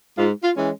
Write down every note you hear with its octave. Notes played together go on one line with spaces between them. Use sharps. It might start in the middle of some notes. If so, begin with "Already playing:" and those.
G#2 F4
F4
E3 G#3 C#4